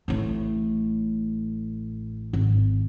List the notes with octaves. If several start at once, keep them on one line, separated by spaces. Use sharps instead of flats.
A1 A2
G#1